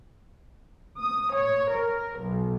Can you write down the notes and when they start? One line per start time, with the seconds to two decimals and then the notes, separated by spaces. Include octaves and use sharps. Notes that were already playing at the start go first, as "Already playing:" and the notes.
1.00 D#6
1.36 C#5
1.74 A#4
2.20 B1